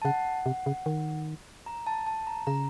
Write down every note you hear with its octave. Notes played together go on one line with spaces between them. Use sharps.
A5
C#3 F#5
C3
C#3
D#3
A#5
A5
A5
A#5
C#3 A#5